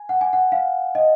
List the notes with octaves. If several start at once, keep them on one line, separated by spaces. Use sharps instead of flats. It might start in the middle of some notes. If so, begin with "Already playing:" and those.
Already playing: G#5
F#5
G#5
F#5
F5
D#5